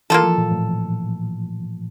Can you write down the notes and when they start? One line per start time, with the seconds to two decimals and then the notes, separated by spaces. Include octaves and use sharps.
0.10 E3 A#3 F4 A4
0.24 F3
0.38 A#2
0.52 A2